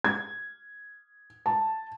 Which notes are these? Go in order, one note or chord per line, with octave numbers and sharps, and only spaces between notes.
G#6
A5